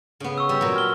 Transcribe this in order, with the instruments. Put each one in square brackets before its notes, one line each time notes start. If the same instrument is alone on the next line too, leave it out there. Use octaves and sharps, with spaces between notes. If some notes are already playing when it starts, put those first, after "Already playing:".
[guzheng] C#3 B3
[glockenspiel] C#6 E6
[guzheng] G3
A#2 F#3
[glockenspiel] F6 G7